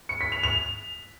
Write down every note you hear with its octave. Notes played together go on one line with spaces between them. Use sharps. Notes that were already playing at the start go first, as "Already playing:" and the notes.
C#7
B6
F7
F7